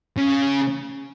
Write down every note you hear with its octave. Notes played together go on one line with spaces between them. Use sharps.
C#3